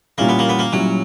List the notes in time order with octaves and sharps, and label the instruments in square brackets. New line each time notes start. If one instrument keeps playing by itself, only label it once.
[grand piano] A#2 G3 C#4 E4 [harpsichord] A#3
[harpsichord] B3
A#3
B3
A#3
[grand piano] A#2 G3 C#4 E4 [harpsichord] F#3